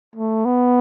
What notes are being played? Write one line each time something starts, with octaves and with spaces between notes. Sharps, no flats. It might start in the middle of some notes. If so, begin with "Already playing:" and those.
A3
B3